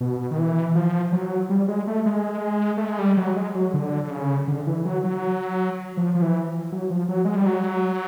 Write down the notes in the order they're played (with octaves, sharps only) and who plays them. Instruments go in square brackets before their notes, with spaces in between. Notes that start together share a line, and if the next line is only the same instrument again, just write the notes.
[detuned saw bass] B2
D#3
E3
F3
F#3
G3
G#3
A3
G#3
A3
G#3
G3
F#3
G#3
F#3
D3
D3
C#3
D3
E3
F#3
F#3
F3
F3
E3
F#3
F3
F#3
G#3
G3
F#3